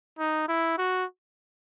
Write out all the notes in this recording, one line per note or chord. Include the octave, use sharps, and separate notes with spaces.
D#4
E4
F#4